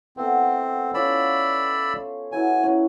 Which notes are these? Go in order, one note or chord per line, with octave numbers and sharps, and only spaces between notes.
A3 B3 C4
C#4 F4 D5 B5 E6
F#3 E4 B4 G#5
C#4 A#4 B4